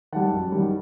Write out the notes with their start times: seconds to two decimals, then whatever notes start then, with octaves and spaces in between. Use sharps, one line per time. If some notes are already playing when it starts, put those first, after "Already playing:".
0.12 D#3 G3 F#5 A5
0.32 F#2
0.52 D#3 G3